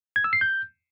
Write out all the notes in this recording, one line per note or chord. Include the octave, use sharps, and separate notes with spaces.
G#6
E6
C7
G6